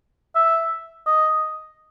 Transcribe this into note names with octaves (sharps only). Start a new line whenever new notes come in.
E5
D#5